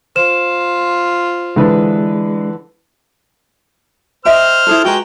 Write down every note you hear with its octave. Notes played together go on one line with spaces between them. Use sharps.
F4 C5 E7
D3 E3 G#3 D4 B4
C5 D#5 E5 G5 F6
E4 G#4 A4
G#3 F#4 B4 G5 A#5